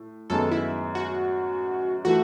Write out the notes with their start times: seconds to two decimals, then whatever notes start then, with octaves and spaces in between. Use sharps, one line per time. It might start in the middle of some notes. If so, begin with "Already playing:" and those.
Already playing: A2
0.30 F#2 D#3 G#3 B3 A4
0.51 E4
0.95 F#4
2.05 E3 A3 E4 F#4